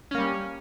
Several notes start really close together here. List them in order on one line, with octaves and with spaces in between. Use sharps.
C#4 A#3 G3